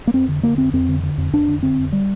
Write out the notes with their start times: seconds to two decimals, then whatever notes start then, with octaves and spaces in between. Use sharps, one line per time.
0.07 A#3
0.14 F2 C4
0.29 D3
0.43 D3 A#3
0.58 F2 C4
0.74 F2 C4
0.88 D3
1.03 D3
1.18 F2
1.33 F2 D4
1.48 D3
1.63 D3 C4
1.79 F2
1.92 G3